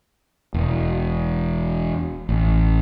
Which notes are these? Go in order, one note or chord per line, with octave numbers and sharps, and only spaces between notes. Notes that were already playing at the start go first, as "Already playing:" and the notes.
E1
A1